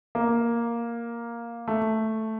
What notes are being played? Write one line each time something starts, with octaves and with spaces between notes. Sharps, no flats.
A#3
A3